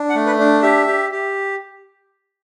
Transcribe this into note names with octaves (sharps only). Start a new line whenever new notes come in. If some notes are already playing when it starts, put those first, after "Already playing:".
Already playing: D4
F#5
A3
B4
D4
G4 E5
G4
G4